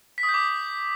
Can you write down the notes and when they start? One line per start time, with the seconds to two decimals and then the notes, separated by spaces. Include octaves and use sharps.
0.18 B6
0.23 D#6
0.29 G6
0.34 D6